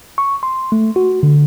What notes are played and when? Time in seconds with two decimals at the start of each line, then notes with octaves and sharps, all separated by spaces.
0.18 C#6
0.43 C6
0.72 A3
0.96 F#4
1.23 D3